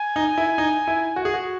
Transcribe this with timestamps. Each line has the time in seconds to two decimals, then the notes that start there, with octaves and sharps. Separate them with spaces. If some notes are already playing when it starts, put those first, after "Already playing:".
Already playing: G#5
0.16 D#4
0.38 E4
0.58 D#4
0.88 E4
1.16 F#4
1.25 G#4
1.34 F#4